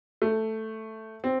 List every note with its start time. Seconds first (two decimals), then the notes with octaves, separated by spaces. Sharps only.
0.22 A3
1.24 C4